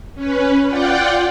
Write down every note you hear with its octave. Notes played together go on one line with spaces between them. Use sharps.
C#4 B4
F4 D5 F#5 G5